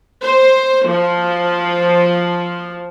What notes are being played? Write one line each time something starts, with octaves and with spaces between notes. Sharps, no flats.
C5
F3